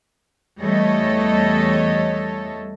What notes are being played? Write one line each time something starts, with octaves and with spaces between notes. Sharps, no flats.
E2 G3 A3 A4 C#5 D#5